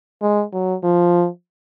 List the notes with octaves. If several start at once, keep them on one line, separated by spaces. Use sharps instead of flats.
G#3
F#3
F3